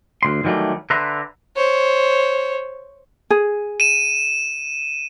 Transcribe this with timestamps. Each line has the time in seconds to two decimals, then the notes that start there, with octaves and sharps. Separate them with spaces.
0.23 D2 C6
0.44 D#3 E3 F#3 G3 A3
0.90 D3 B4 E5 A#5 C6
1.56 C5 C#5
3.30 G#4
3.80 D#7 E7